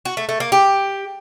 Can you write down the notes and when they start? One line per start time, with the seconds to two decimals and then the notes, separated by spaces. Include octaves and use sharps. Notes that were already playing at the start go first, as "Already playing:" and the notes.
0.05 F#4
0.17 A3
0.29 A3
0.40 A#3
0.52 G4